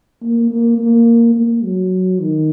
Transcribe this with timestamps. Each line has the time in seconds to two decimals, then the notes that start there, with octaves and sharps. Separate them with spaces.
0.22 A#3
0.50 A#3
0.78 A#3
1.36 A#3
1.64 F#3
2.21 D#3